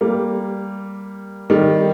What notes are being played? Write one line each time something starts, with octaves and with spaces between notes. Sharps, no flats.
G3 A#3
D#3 G3